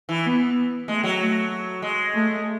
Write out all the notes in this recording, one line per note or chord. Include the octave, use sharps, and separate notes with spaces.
E3
B3
G#3 A3
F#3
A3
G#3
A3